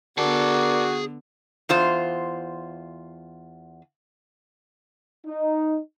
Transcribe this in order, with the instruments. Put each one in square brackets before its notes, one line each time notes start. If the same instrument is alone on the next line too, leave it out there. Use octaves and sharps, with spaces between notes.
[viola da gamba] D3 B3 [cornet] F#4 [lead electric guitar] G#4 A5 [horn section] A#4 D5
[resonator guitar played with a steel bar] E2 F4 C5
[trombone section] D#4